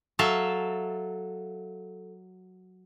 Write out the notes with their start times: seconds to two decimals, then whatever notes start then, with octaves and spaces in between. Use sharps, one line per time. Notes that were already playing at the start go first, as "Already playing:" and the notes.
0.19 F#3 A4 E5 F5 A5